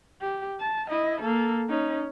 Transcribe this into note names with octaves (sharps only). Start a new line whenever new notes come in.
G4
A5
E4 D#5
A#3 A4
C#4 D#4